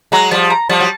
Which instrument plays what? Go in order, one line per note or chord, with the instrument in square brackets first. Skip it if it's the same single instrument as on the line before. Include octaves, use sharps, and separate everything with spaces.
[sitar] F#3 G#3 [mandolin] A#5
[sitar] F3 G3 [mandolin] A5
[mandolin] A#5
[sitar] F3 G3 [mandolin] A5
[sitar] F#3